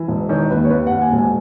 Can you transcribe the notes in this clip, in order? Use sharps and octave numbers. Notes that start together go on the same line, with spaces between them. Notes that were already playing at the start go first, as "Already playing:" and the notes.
Already playing: E3
E1
D#3 C#5
D#2 B4
C#5
D#2 B4
D#2 F#5
G#5
E1
G#5